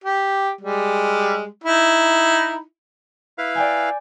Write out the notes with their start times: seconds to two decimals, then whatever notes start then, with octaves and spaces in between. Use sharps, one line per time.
0.04 G4
0.61 G3 G#3
1.64 D#4 E4
3.38 E4 B4 F5
3.55 D5 G5 G#5